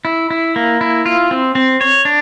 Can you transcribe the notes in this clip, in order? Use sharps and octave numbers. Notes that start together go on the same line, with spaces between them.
E4
E4
A#3
E4
F4
C4
C4
C#5
D4